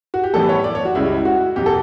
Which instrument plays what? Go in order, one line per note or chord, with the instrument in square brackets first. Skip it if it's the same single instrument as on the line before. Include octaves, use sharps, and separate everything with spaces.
[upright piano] F#4
G4
[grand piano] A2 E3 G3 B3 [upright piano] A4
[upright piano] C#5
D5
C#5
F#4
[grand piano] C#2 C#3 G3 [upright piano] E4
[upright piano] F#4
[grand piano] E2 B2 F#3 [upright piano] G4
[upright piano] A4